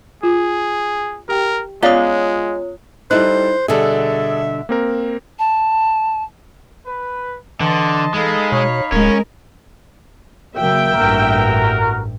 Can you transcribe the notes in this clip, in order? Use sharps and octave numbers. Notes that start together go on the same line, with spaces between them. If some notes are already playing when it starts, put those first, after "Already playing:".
F4 G#4
G4 A#4 G5
G#3 B3 C#4 F4 C#5 D5 F5 D#6
G3 D#4 E4 A4 C5 F#6
B2 D3 G3 G#4 A4 D5 E5
A#3 C4 A#4
A5
B4
D3 E3 D#5 A5 C6
G#3 D#4 A4 F5 B5
B2 C#5
D1 G#3 C#4 A#4
C#3 F#3 A#3 E5 G5
A1 G2 F#4 A#4